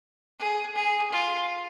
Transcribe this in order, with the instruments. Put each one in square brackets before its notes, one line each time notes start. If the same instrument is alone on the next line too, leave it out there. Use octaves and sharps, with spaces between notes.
[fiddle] G#4
G#4
F4